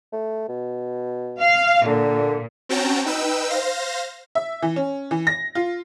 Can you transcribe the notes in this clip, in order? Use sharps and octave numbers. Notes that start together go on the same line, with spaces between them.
A3
B2
F5
A#2 D3
C4 C#4 F#4 G5 A5 A#5
D#4 B4 G5 E6
C5 F5 A#6
E5
E3
C#4
E3
A#6
F4